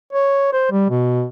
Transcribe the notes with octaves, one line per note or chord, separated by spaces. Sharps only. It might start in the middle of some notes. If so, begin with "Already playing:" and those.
C#5
C5
G3
B2